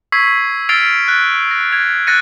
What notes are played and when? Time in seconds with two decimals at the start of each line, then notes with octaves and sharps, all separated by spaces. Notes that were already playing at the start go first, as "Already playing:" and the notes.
0.12 C#6 E6 G#6 B6 C7
0.69 E6 F6 A6 C7 D7 F7
1.08 F#6 A6
1.51 A#6
1.72 G#6 F7
2.07 F#6 A6 A#6 C#7 D#7